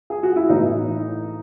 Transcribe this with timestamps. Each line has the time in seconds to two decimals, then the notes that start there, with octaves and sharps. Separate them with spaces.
0.10 G#4
0.23 F#4
0.36 E4
0.49 A2 E3 D#4